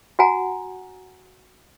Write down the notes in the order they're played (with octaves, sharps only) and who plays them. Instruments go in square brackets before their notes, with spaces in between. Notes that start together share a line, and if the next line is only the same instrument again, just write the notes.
[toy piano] F#4 F#5 G#5 A#5